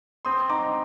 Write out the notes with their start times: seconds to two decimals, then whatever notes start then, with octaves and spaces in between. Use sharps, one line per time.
0.25 C4 C6 D#6
0.50 D#4 A#5 D6